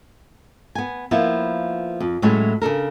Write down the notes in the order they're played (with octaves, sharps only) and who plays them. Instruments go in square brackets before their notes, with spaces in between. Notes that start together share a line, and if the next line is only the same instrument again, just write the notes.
[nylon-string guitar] B3 G#5
F3 A#3 B3 E4
F2
A2 F#3 G#3 A3 C#4 E4
C#3 D4 A4 A#4